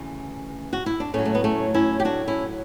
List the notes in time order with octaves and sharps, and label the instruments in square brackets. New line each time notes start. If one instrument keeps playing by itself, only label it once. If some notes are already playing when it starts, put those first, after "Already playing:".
Already playing: [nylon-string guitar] D2 C#3 E3
F#4
E4
D4
A2 F#3 A3 C#4
A3
B3
A3 C#4
C#4 E4
G4
D4 F#4
C#4 E4